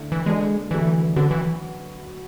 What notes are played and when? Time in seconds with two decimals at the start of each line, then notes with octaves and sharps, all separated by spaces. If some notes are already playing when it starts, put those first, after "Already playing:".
Already playing: D3 A3 E4
0.12 E3
0.26 G#3 B3 D4 F#4 A4 D5
0.70 D3 E3 F#3 A3
1.16 D3 F#3 C#4 F#4 B4
1.31 E3